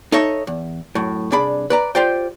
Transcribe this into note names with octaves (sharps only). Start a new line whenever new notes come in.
D#4 A4 C#5 D#5 E5
E2
F#2 A2
C2 D4 G#4 D5 B5
B4 D5 A#5
F4 G4 C5 D5 G5